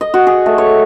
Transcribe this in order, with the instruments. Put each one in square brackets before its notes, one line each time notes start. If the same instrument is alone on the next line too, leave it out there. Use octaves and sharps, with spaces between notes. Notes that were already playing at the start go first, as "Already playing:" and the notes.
[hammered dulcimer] D#5
F#4
G#4
A3
C#5